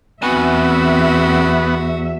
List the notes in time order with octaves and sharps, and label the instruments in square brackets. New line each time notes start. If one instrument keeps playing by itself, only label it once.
[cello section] E2 E5 [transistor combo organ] B3 [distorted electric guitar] C4 G#5 [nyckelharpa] F#4